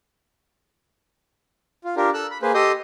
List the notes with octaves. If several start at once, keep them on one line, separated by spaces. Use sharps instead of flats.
F4
D4 F4 G4 A#4
A4 E6 F#6
B5
A#3 G#4 B4 C5
G4 A4 D#5 C6 D#6 G6